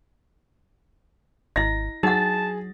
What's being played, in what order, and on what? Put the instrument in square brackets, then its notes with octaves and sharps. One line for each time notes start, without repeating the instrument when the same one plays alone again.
[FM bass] G#1 [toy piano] E4 D#5 [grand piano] A#6
[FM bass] F#3 [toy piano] D#4 F#5 [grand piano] G#4 A6 [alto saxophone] A5